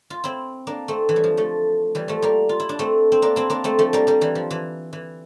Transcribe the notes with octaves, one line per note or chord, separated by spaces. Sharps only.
F4
C4 E4
A#3 D4
A3 C4
E3
G3
F3
F3 A3
E3 G3
F3 A3
G3 A#3
F4
E4
D4
A3 C4
C4
A#3 D4
C4 E4
A#3 D4
A3 C4
F3 A3
G3 A#3
G3 A#3
E3 G3
F3
E3
E3